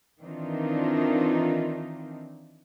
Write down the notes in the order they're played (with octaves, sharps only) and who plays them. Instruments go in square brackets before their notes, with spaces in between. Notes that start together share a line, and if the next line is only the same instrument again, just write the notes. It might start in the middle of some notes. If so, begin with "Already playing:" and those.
[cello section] D#3 E3 C4 D4 D#4 F4